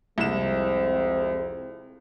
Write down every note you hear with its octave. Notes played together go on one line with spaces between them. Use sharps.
C2 F2 G#3 C4 E7